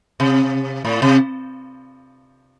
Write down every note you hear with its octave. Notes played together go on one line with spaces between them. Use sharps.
C3
A2
C3